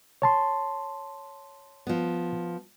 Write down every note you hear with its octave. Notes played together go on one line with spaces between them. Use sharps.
C#5 A5 C6
F3 B3